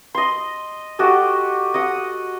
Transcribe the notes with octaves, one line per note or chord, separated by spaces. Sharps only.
D#5 C6
F#4 G4 A4 D#5
D#5 F#5 D#6